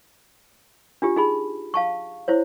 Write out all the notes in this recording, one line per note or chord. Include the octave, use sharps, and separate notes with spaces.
D4 F4 G4
D#4 G#4 B5
F5 A5 C#6
E4 C5 C#5